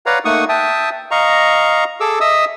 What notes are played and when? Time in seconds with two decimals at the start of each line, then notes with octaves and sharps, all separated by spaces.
0.06 B4 C#5 D5 F5 F#5 A#5
0.25 A3 A#3 D#4 F#5 C#6 D#6
0.49 E5 G5 A5 D#6
1.11 D#5 F5 A#5 C#6
2.00 G#4 A4 D6 E6
2.21 D#5 E5 D#6 E6